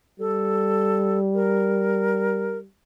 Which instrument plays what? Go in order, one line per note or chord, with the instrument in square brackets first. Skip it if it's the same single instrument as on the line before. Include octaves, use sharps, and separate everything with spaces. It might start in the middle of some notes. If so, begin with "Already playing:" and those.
[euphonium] G3 [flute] A4
[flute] A#4